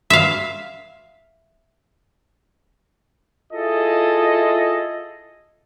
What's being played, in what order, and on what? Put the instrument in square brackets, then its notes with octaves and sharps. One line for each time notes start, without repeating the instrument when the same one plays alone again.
[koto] E5 F5
[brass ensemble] E4 F4 G#4 A4 D#5